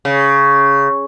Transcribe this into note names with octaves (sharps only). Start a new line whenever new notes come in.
C#3